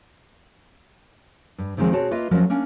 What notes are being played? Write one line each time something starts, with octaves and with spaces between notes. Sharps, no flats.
G2
C3 D#3 F3 G#3 C4
B2 C4 F#4 G#4 C#5 A5
A#3 F4 B4 D#5 E5
F3 F#3 A3 C#4 A#4
A#3 C#4 D4